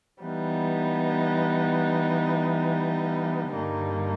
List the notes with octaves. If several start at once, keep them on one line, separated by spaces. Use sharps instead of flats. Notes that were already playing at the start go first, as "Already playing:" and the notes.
E3 G3 B3 D#4
G2 D3 G3 A#3 D#4